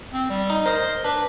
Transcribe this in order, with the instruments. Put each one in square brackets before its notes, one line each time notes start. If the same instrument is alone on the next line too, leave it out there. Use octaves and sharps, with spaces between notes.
[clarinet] C4
G3
[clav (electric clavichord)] D#4
[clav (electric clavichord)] A#4 D#5 [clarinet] C5
[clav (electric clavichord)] D4 [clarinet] B4